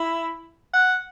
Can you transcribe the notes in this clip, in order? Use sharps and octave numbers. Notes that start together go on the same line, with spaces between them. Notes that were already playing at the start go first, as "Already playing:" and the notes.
Already playing: E4
F#5